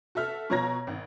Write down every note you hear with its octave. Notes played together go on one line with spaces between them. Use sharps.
F#4 A4 E5 F6
B2 F3 C#5 A#5 G#6 A#6
G#1